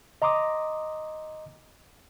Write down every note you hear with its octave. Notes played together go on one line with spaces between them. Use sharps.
D#5 A#5 C6 D6 D#6